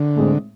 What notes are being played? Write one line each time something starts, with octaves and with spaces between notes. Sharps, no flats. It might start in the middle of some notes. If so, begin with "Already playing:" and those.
Already playing: D3
A2 G#3 C4